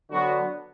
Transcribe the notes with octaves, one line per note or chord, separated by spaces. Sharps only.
D3 F#3 B3 F#4